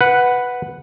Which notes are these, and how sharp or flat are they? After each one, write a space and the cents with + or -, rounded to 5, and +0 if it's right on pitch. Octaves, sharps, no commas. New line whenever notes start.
B4 +0 F#5 +0